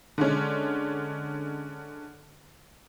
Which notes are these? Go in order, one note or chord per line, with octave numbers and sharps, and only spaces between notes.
D3 G#3 C#4